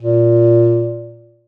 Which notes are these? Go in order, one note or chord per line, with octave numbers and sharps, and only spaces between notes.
A#2